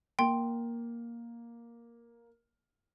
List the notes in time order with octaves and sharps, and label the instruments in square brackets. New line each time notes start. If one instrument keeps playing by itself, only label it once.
[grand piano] A#3 [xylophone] G5 C6